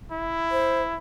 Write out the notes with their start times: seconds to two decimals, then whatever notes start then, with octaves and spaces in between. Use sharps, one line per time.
0.12 E4
0.51 C5